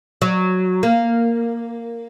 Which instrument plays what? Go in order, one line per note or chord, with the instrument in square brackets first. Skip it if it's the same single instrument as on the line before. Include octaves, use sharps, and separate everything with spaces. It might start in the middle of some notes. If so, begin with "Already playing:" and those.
[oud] F#3
A#3